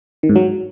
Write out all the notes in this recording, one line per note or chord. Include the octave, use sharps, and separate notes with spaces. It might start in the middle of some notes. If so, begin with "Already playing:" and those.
D#3
G#2
F#3